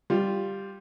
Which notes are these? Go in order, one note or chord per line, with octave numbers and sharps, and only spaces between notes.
G3 F4